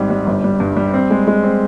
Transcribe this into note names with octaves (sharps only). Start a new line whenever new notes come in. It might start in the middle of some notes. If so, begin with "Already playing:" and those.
Already playing: G#1 G#2 G3 C4
G3
G1
G3
G2
G3
C4
G#3
G#3
C4